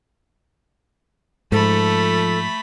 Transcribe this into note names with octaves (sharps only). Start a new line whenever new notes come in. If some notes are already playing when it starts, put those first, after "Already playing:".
G#2 F3 A3 A4 B5